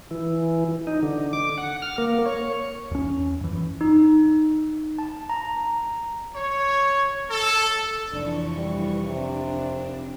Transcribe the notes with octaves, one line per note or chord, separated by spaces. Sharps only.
E3
D#4
D3
D6
F#5
F6
A#3
C#5
E2 C#4
F#2 E3
D#4
A5
A#5
C#5
A4
F1 E3 D4 C#6
G3
C3 D4